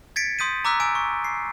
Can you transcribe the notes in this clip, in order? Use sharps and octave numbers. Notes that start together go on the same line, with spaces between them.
G#6 A6 B6 C#7 D7
C6 D#6 G6 B6 D#7
A#5 D6 E6 F#6 B6
G#5 E6 D7
C#6
C7